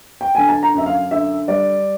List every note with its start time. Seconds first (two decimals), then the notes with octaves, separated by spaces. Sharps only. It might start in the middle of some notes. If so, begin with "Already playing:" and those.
0.21 G5
0.35 D3 G#5
0.49 A5
0.63 A#5
0.74 F#2 E5
0.86 F5
1.11 D3 E5
1.48 G3 D5